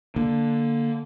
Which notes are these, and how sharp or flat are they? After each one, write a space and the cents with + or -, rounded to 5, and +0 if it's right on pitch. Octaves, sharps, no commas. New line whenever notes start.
D3 +0 A#3 +0